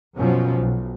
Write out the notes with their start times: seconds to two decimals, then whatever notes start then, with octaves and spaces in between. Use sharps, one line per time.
0.16 F#2 B2 F3 F#3 C#4
0.58 B1